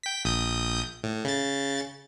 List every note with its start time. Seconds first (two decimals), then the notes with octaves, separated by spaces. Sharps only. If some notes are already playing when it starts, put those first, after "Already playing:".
0.03 G5 B6
0.25 A#1 D#6 G6
1.04 A2
1.25 C#3 A6